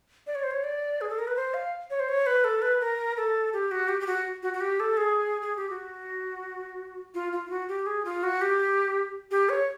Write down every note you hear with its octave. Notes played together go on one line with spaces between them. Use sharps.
D5
C#5
C5
C#5
D5
G#4
A4
A#4
B4
C5
F5
C#5
C5
C#5
B4
A4
B4
A#4
A4
G4
F#4
G4
G4
F#4
F#4
F#4
G4
A4
G#4
G#4
G4
F#4
F4
F4
F4
F#4
G4
G#4
F4
F#4
G4
G4
C#5